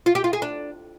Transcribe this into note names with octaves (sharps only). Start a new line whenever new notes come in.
F4
G4
F4
G#4
D4